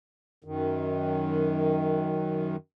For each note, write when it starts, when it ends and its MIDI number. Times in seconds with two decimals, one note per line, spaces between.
0.44 2.56 42
0.44 2.56 51